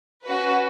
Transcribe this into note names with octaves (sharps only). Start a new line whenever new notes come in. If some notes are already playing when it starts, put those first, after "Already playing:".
C#4 F#4 B4